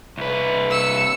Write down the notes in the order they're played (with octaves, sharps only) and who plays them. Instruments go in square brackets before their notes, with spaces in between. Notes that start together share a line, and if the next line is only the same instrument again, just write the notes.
[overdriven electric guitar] C2 B4
[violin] E6 C#7